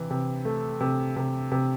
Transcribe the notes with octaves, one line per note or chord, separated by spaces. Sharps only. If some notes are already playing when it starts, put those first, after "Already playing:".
Already playing: C3 E3
C3
A3
C3
C3
C3